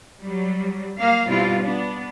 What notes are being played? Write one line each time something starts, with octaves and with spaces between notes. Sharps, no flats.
F#3 G3
A#3 F5
B2 G3 C4 E4 F4
B3 D4